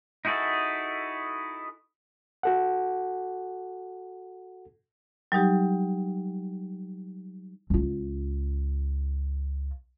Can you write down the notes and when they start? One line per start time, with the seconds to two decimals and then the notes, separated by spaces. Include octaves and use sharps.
0.25 D#4 E4 F#4 G#4 A4
2.43 F#4 A4 F#5
5.32 F#3 G3 D#4 G4
7.70 C#2 F4